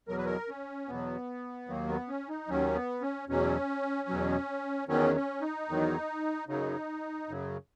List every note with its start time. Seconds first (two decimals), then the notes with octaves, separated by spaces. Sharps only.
0.08 E2 B2 F#3 A#4
0.17 B4
0.25 A#4
0.49 C#4
0.88 E2 B2 F#3 B3
1.68 D#2 D#3 F#3 A#3
1.89 B3
2.08 C#4
2.29 D#4
2.48 D#2 D#3 F#3 C#4
2.75 B3
3.02 C#4
3.29 E2 B2 F#3 C#4
4.09 E2 B2 F#3
4.88 E2 D#3 F#3 C#4
5.16 C#4
5.41 D#4
5.69 E2 D#3 F#3
6.48 F#2 C#3 F#3 D#4
7.29 F#2 C#3 F#3